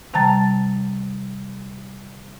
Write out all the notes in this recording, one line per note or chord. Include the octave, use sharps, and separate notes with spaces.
C3 D#3 G3 A5 A#5 A6